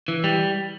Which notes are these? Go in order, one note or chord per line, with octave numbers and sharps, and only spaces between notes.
E3
G3